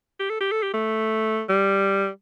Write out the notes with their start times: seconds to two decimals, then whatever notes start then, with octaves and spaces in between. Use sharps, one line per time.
0.19 G4
0.30 A4
0.40 G4
0.51 A4
0.63 G4
0.73 A3
1.49 G3